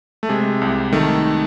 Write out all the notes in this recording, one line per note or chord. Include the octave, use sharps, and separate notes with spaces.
A3
C3 G#3
C2
D#3 A3